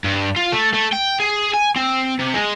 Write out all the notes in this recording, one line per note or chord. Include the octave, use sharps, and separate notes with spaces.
G2
F4
A3
A3
G5
G#4
G#5
C4
C3
G#3